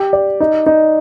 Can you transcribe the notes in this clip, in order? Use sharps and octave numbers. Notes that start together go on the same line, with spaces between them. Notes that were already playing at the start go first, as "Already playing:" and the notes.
Already playing: G4
D5
D#4
D#4